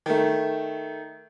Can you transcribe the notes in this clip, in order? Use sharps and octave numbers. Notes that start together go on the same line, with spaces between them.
D#3 A3